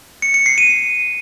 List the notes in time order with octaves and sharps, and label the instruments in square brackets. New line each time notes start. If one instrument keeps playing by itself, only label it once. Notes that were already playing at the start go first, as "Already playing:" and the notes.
[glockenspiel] C#7
C#7
C7
D#7